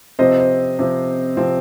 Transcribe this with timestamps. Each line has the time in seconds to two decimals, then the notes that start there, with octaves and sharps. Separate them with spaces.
0.19 C3 F3 C4 C5 D#5
0.40 C5
0.79 C3 F3 C4
1.37 C3 F3 C4